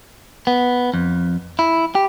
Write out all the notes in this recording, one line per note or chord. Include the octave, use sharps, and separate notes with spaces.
B3
F2
E4
G4